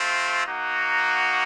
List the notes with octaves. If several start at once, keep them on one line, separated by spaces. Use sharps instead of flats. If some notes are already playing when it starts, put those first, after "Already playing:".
Already playing: A3 C4 F4
A#3 D#4 F#4